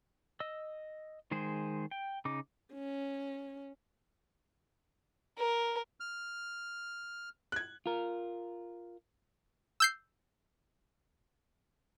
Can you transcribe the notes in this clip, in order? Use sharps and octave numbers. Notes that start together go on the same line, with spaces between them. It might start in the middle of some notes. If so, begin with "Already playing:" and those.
D#5 E6
D#3 G#3 G#4 C5
G5
C#3 D#4 D6
C#4
A#4
F6
F#6 G#6
F4 A#4
E6 G6 C7